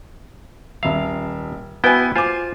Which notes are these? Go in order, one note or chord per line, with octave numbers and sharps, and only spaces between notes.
D#1 E5 F5
B3 E4 F#4 B4 G5 G#5
F4 C5 G#5 D6